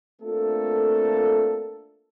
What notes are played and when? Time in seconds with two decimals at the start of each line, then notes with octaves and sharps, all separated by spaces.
0.22 A3 A#3 C4 D4 F4 A4